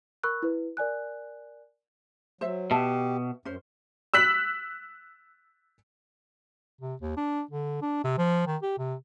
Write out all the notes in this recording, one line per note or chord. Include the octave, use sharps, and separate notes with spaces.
A#4 B5 C#6 E6 F#6
E4 B4
A#4 D5 G#5 F#6
F#3 C5 E5
B2 G4 E5 A5
F#2 C#4 C5
E6 F#6 B6 F#7
C3
D#2
D4
D3
D4
C3
F3
D#3
G4
C3